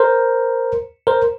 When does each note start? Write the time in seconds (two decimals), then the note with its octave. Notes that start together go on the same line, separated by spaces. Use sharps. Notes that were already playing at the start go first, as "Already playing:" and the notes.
Already playing: A#4 C5
1.07 A#4 C5